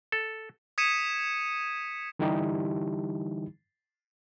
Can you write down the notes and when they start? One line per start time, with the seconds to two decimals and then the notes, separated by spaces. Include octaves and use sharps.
0.12 A4
0.78 D#6 G#6 B6 C#7 D#7 E7
2.19 D3 E3 G3 D#4 E4 G4